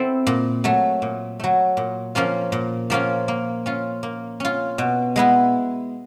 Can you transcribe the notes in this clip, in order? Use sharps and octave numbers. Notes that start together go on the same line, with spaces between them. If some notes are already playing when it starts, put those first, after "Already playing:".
Already playing: C4 E4 A4 C5
A#2
F#3 A3
A#2
F#3 A3
A#2
F3 A#3 C#4 F4
A#2
F3 A#3 C#4 F4
A#3
C#4 F4
A#3
C#4 F4
B2
G#3 B3 E4